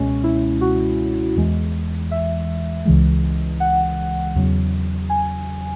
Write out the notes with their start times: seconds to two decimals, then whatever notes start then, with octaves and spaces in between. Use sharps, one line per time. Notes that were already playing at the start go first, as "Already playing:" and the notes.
Already playing: C#2 B2 G#3 C#4
0.24 E4
0.61 F#4
1.36 E2 E3 G#3
2.11 E5
2.86 C#2 C#3 E3 G#3
3.60 F#5
4.35 E2 C#3 F#3
5.10 G#5